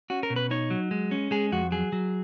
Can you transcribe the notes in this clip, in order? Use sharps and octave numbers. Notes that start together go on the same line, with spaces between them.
C#4 F#4
A#4
B2
B4
D#4 C#5
F#3
G#3
C#4
G#3 G#4
F2 F#4
F#3 G#4
F#3